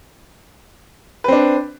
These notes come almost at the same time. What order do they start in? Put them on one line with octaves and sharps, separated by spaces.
B4 C4 D4